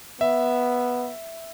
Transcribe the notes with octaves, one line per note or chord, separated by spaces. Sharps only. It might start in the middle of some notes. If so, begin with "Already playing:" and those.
B3 E5